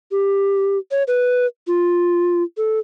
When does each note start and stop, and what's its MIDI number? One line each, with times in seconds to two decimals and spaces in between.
0.11 0.78 67
0.91 1.03 73
1.07 1.46 71
1.67 2.43 65
2.57 2.79 69